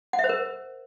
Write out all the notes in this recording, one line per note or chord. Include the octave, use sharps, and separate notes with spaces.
F#5
E5
C5
A#4